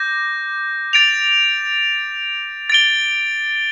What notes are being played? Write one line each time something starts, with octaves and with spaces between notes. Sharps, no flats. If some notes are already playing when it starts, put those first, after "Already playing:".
Already playing: D6 G6 A#6
A6 D7 F7
A6 D7 G7